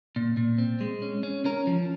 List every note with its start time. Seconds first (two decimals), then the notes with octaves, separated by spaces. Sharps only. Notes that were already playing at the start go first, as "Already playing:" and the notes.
0.16 A#2
0.37 A#2
0.58 C4
0.81 G#3
1.02 C#4
1.23 C#4
1.45 C#4 A#4
1.67 F3